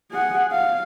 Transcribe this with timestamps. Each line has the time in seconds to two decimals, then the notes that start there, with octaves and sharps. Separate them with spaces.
0.12 G#4 F#5
0.52 F5